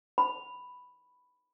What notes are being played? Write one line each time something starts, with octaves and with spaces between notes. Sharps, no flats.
B5